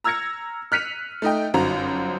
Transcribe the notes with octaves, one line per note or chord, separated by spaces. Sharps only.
A#5 E6 F6 G#6 A#6 C#7
F6 F#6 B6 C#7 D#7 F7
A3 D#4 D#5 G5
G1 F#2 D#4 F#4 C5 A#5